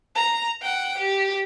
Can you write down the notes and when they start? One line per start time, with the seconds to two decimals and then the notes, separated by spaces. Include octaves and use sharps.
0.15 A#5
0.62 F#5 G5
0.98 G4